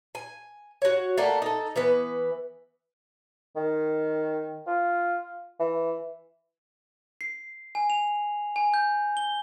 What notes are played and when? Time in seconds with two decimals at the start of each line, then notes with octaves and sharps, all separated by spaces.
0.15 G#5
0.82 F#4 C#5
1.18 A3 A#3 D5 F#5
1.42 D#4 A4
1.76 E3 B3 B4
3.56 D#3
4.67 F4
5.60 E3
7.21 C7
7.75 G#5
7.90 F7
8.56 G#5
8.74 G6
9.17 G7